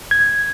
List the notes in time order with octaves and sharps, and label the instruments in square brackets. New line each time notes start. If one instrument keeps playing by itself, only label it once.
[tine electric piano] G#6